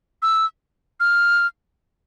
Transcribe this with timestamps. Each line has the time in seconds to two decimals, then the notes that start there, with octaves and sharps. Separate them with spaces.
0.22 E6
1.00 F6